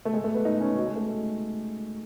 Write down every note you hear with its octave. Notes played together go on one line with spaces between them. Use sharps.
A3
G#3
A3
B3
D#4
C#4
F#3
G#3
A3